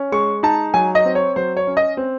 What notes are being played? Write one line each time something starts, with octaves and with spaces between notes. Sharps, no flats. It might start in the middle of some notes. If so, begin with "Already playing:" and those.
Already playing: C#4
G#3 C#6
D#4 A5
F#3 G#5
D#5
C4
C#5
F#3 C5
C#5
C#4
D#5
C4